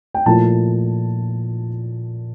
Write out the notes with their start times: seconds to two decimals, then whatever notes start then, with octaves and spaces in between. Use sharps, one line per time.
0.14 G5
0.26 A#2 F3 A3 E4 A5